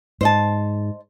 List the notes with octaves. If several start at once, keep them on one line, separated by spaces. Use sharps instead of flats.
G#2 C5 D#5 A5